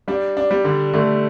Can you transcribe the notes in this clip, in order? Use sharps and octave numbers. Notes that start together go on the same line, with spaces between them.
G3 D4
D4
G3
D3
D3 A3